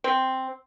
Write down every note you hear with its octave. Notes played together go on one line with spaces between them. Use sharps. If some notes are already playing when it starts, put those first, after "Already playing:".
C4